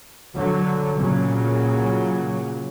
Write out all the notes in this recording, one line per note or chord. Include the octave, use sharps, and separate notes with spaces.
D3 F#3
A#2 C#3 F#3